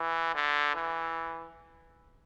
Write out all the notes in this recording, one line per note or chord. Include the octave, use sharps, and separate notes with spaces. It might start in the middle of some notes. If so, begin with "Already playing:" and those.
Already playing: E3
D3
E3